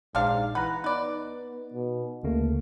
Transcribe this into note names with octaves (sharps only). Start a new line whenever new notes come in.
A#1 G#2 C3 D4 F5
E3 B4 F#5 A#5
B3 D#4 B4 D5
B2
D2 C#3 A3 A#3